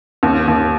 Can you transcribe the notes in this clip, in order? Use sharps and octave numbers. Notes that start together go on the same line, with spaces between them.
D#2
D#2